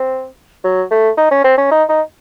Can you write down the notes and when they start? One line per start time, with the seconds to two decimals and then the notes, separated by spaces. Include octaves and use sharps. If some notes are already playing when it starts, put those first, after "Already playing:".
Already playing: C4
0.64 F#3
0.91 A3
1.17 D#4
1.31 C#4
1.44 C4
1.58 C#4
1.71 D#4
1.89 D#4